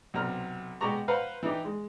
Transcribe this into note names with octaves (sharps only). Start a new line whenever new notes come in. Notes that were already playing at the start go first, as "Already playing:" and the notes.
B1 C3 A#5 F6
B2 G#3 F#4 G4 A#5 C#6
B4 C5 F5 F#5 A#5
E3 D#4 G4
G#3